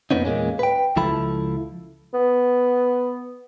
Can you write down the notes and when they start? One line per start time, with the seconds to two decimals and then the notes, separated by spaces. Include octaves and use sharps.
0.11 F2 C3 A#3 B3 C#4 D#4
0.25 E2 A#2 G#3 A#3 C#4
0.59 B4 G5
0.96 C#2 F3 E4 A4 B5
2.14 B3